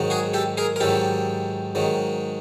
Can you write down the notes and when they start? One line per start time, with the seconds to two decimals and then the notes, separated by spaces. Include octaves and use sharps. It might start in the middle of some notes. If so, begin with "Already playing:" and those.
Already playing: G#2 D#3 F#3
0.10 F#4 G#4
0.34 G4 A4
0.57 G#4 A#4
0.76 A#4
0.80 G#2 D#3 F#3 G4 A4
1.75 G#2 D#3 F#3